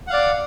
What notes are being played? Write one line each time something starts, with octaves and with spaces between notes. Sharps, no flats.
D5 F5 F#5